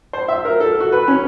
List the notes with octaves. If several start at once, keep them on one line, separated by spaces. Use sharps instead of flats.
C5
E5
A#4
A4
F#4
B4
C#4